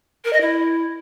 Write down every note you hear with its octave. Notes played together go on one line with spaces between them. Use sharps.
A#4
D#5
E4